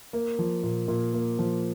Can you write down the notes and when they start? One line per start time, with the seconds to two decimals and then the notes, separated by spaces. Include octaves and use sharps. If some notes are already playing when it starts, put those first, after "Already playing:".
0.13 A#3
0.39 F3
0.64 A#2
0.88 A#2
1.14 A#3
1.39 F3